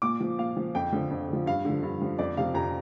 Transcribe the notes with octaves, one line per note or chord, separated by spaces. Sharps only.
A#2 D6
F3
A#2 F5
F3
F2 G5
D3 F3
F2
D3 F3
G2 F5
D3 F3
G2
D3 F3
F2 D5
C3 F3 F5
F2 A#5